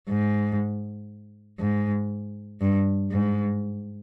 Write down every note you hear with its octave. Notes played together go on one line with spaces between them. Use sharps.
G#2
G#2
G2
G#2